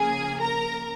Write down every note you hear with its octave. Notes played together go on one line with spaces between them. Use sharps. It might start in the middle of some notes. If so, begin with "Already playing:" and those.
Already playing: C#3 F3 A#3 G#4 G#5
A#4 A#5